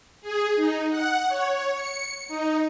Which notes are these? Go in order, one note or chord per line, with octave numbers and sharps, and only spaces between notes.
G#4
D#4
F#5
C#5
C#7
D#4